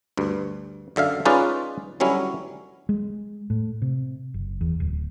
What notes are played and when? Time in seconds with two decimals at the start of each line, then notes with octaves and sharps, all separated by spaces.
0.17 D2 G2
0.96 F#2 D3 E5 F5
1.25 G#3 C#4 D#4 F4 B4 D5
2.00 D3 F#3 G3 C#4 E4
2.89 G#3
3.50 A2
3.82 C3
4.34 F#1
4.61 E2
4.80 D1